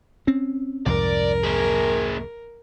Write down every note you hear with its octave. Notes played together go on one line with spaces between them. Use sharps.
C4 C#4
C2 F2 G#2 A#4 D5
A#3 G#4